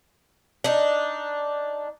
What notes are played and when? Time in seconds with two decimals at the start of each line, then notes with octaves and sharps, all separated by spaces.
0.64 D4 D#4